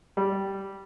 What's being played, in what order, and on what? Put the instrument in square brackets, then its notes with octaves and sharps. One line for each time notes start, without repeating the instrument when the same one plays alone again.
[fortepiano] G3